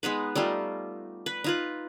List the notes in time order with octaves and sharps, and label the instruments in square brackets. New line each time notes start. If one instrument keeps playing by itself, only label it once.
[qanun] G#3 B3 D#4 B4
G3 A3 D#4 F4
B4
D#4 F4 B4